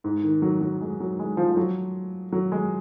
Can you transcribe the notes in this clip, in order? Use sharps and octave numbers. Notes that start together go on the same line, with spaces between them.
G#2
D#3
F#3
F#3
G#3
F#3
G#3
F3
F3
F#3
F#3
G#3